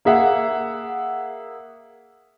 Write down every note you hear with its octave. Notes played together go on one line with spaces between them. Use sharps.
A#3 G#4 E5 F#5